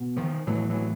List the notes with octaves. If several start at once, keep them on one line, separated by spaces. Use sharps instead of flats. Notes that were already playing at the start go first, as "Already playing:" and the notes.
Already playing: B2
D#3 F3
A2 E3 F#3
E3 F#3